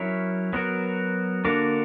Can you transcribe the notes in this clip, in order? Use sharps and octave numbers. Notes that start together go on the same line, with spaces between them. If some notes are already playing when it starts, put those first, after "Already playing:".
Already playing: F#3 C#4 E4 A#4 C#5
F#3 B3 F#4 A#4
D3 A#3 D4 F#4 A#4